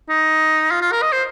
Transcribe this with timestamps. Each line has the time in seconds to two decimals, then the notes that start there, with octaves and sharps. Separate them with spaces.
0.09 D#4
0.71 F4
0.81 F4
0.92 A#4
1.02 D#5
1.12 C5